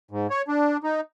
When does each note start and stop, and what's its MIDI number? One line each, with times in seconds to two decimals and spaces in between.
0.11 0.27 44
0.30 0.42 73
0.48 0.77 62
0.83 1.01 63